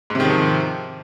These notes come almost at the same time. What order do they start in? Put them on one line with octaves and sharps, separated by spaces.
G#2 C3 D#3 F3